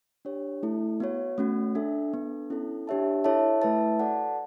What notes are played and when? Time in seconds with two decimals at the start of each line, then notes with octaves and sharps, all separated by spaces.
0.25 D4 G4 C#5
0.63 A3 E4 A4
1.00 B3 F#4 C#5
1.38 A3 C#4 F#4
1.75 D4 A4 E5
2.13 B3 D4 A4
2.50 C#4 E4 A4
2.87 D4 G4 C#5 E5 A5
3.24 E4 A4 C#5 E5 A5
3.62 A3 E4 B4 E5 A5
3.99 F#4 A4 D5 F#5 A5